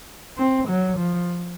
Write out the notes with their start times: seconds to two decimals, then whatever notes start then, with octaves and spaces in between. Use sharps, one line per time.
0.38 C4
0.68 F#3
0.98 F3